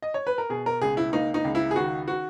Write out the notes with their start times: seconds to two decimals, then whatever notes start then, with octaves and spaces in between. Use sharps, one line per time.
0.02 D#5
0.14 C#5
0.27 B4
0.38 A#4
0.50 B2 G#4
0.66 A#4
0.81 C#2 G#4
0.97 E4
1.13 A#3 D#4
1.34 D#4
1.45 C#2
1.55 E4
1.71 G#4
1.76 D#3 F#4
2.08 F#4